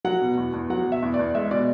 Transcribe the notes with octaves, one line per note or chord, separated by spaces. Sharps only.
F#3 F#5
B2
E2
E2
F#3 F#5
B2
E5
E2
D5
E2
G#3 E5
B2 D5